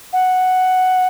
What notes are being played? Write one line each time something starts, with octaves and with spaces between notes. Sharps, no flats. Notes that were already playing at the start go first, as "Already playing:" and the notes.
F#5